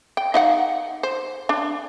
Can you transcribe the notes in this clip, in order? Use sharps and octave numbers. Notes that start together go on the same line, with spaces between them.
G5
D#4 F5 F#5
C5
D4